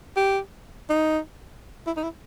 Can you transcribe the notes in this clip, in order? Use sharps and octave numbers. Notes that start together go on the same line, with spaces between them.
G4
D#4
E4
D#4
E4